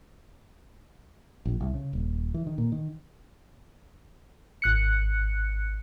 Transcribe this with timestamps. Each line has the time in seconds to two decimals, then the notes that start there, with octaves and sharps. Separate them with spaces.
1.45 A#1
1.60 C2
1.74 C#3
1.93 D#1
2.34 E3
2.47 D#3
2.58 A#2
2.72 D#3
4.62 G#1 F#6 C#7